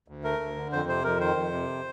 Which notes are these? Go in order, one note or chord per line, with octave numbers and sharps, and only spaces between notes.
D2
A3 A#4
D2
D3
F2 C5
C3 C5
F2 A#4
D#3 C5
F2
C3